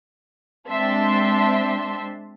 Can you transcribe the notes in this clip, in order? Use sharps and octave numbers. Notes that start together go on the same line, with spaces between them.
G#3 C4 D4 E5 A5 C6